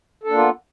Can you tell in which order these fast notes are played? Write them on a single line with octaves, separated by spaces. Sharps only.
A4 D4 A#3 F4 B3